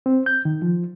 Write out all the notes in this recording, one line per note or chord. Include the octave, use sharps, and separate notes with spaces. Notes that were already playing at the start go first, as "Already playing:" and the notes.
C4
G6
D#3
F3